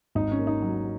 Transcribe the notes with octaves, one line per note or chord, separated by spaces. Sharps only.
G#1 D#4
C#4
A#3
D#4
F#3